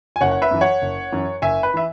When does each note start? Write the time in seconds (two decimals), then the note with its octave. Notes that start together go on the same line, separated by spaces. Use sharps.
0.16 G#5
0.21 F#1 C#5 F#5
0.31 F#5
0.42 B4 E5
0.51 F#2 E3
0.61 C#5 F#5
0.82 F#1
1.12 F#2 E3
1.42 F#1 E5 G#5
1.63 B4
1.74 E3 E5